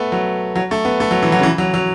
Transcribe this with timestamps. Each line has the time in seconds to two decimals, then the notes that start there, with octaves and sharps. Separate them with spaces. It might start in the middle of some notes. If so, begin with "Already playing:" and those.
Already playing: A3 B3
0.12 F#3
0.56 F#3
0.71 A3
0.85 B3
1.00 A3
1.11 F#3
1.23 E3
1.32 F#3
1.39 C#3
1.43 E3
1.58 F#3
1.74 F#3